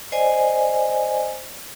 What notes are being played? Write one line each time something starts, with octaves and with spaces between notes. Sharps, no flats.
C5 D5 D#5 G#5